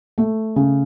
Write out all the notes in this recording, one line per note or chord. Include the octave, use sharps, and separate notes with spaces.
A3
C#3